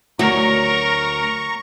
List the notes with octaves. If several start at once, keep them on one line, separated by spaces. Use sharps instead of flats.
D2 F#3 F#4 A#4 A#5 C#6